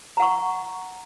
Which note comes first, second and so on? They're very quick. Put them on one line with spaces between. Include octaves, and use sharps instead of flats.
A#5 F#5 C#6